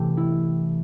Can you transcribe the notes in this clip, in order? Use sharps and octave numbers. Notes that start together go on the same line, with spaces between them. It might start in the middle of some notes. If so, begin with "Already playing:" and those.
Already playing: C3 E3 A3 G4
E4